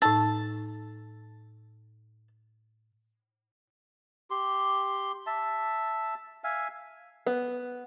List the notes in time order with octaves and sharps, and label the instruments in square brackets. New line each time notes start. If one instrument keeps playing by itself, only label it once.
[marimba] A2 D#4 E6 [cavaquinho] A5
[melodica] G4 C6
E5 A5
E5 F5 G#5
[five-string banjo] B3